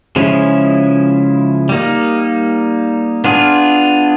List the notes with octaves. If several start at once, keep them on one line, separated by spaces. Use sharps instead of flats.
C#3 F3 G#3 C#4 E4
G3 A#3 D#4
B3 D4 F4 G#4